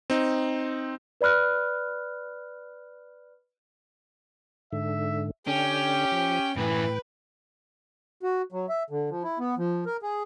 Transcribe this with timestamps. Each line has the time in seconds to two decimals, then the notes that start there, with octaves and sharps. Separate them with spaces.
0.10 C4 D#4
1.21 B4 D5 B5 F6 F#6
4.72 G#2 D3 E5
5.47 D3 C#4 D4 G4 G5
6.12 F3
6.57 F#2 A2 E3 B4 G5
8.23 F#4
8.52 F#3
8.69 E5
8.90 D3
9.09 F3
9.23 E4
9.39 B3
9.58 F3
9.86 A#4
10.02 G#4